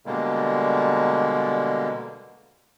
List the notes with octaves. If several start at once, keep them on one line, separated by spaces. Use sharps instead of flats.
B2 D3 G3 G#3 A#3